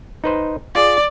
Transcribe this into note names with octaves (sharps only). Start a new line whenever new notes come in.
D#4 B4 C5
F4 G#4 D5